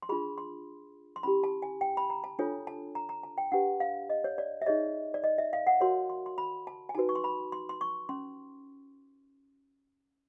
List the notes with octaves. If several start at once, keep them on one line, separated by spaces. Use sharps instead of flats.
C6
D4 F4 G#4 B5
C6
C6
C#4 E4 G4 B5
A5
G#5
G5
B5
A#5
A5
D4 F4 A4 C#5 G#5
A5
A#5
A#5
A5
G5
D4 G4 B4 F#5
F5
D#5
C#5
D5
E5
D#4 G#4 C#5 D#5
D5
D#5
E5
F5
F#5
F#4 A#4 C#5 C6
C6
C6
B5
A5
G#5
D#4 F#4 B4 A5
C#6
C6
B5
C6
C6
C#6
C#4 C6